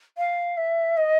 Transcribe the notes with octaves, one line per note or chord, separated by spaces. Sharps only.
F5
E5
D#5